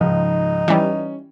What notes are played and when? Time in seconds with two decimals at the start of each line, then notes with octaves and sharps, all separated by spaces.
0.01 C#2 G#2 F3 D#4
0.68 E3 G3 C#4